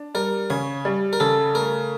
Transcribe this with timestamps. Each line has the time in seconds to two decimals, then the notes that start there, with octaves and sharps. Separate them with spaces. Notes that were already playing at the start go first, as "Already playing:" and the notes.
Already playing: D4
0.15 G3 A#4
0.50 C#3 C#5
0.85 G3
1.13 A#4
1.20 C#3 A4
1.55 A3 A#4